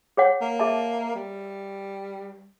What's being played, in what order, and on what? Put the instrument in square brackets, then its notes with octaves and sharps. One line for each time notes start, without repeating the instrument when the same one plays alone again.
[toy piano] G#4 C#5 F#5
[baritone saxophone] A#3
[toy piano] G#4 E5 A5
[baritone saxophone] G3